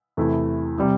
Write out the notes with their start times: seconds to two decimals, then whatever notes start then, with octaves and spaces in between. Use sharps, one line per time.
0.17 E2 C3 A3 E4
0.78 C3 G3